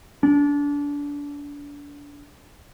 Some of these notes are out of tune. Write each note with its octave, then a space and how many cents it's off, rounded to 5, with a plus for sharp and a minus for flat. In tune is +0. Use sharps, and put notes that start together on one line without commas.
D4 -30